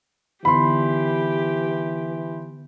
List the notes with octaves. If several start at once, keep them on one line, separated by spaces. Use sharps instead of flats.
D3 E3 B3 D#4 G4 B5 C6